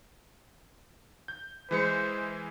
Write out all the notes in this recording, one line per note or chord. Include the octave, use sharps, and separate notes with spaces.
G6
E3 G#3 C5 C#7